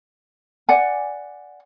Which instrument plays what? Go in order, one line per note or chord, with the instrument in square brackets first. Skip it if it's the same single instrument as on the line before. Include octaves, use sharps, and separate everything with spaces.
[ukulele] D5 F#5 G#5